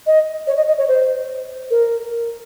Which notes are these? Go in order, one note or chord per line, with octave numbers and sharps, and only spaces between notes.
D#5
C#5
D#5
D#5
C#5
C5
A#4